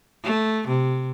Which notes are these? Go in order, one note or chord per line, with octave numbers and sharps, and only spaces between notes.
A3
C3